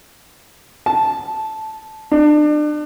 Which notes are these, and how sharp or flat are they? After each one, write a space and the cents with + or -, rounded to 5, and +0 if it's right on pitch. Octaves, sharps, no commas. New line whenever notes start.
A5 -10
D4 +35